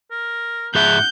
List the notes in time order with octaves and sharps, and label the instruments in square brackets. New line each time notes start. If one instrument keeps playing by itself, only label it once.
[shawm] A#4
[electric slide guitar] G#2 G#4 E5 [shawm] F#5 [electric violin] G6